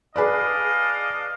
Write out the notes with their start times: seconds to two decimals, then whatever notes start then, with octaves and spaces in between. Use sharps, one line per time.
0.16 D4 G#4 B4 D5 D#5 F5